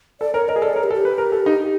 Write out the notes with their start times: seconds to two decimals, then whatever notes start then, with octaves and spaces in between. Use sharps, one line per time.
0.20 A4 D5
0.34 A#4 C#5
0.48 A#4 D#5
0.56 G#4
0.62 A4 D5
0.73 A#4 C#5
0.83 G4
0.91 A4
0.94 G4
1.05 B4
1.18 A#4
1.32 A4
1.46 D#4